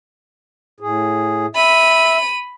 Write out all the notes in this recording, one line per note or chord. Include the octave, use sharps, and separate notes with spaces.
A2 G#4
E5 B5 D#7